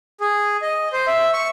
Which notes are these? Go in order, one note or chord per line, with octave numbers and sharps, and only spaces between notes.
G#4
D#5
C5
E5
C#6